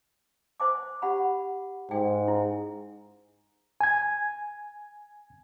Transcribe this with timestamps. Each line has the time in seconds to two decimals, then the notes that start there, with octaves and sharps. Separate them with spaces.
0.60 C5 G#5 D6
1.02 G4 F#5 B5
1.91 G#2 G5
2.28 E4
3.81 G#5 G#6